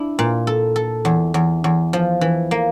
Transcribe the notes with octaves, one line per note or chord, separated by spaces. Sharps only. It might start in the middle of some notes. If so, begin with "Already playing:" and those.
Already playing: D4 E4
A#2
A4
A4
E2
E2
E2
F3
E3
A#3